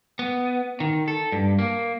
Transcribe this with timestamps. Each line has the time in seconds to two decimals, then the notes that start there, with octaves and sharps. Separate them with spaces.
0.19 B3
0.80 D#3
1.08 A4
1.32 G2
1.59 A#3